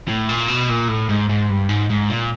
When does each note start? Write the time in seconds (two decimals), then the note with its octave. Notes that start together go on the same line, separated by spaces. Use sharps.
0.08 A2
0.29 A#2
0.48 B2
0.69 A#2
0.88 A2
1.09 G#2
1.29 G#2
1.50 G2
1.69 G#2
1.90 G#2
2.10 A#2